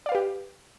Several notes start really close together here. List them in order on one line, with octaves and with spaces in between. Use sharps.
D5 F5 B4 G4